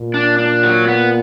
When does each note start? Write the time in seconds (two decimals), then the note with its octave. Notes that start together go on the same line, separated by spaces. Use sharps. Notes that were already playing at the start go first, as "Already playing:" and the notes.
Already playing: A#2
0.14 D4
0.39 D4
0.63 F#3
0.88 B3